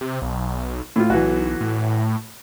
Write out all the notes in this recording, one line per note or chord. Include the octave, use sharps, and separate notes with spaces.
C3
B1
A2 F4
B1 E3 F#4
A2